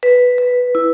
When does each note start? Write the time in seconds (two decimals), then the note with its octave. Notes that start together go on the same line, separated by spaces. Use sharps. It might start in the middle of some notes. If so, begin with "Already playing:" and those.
0.03 B4
0.38 B4
0.75 E4